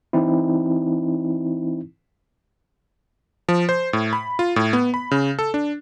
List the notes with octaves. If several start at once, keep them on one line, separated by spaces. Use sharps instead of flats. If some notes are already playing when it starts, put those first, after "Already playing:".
E3 C4 D#4 E4
F3
C5
A2
B5
F4
A2
B3
B5
C#3
A4
D4